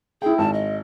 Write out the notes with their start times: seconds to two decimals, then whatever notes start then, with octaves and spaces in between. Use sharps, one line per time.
0.22 E4 G#4 G5
0.38 G#1 A5
0.54 D#5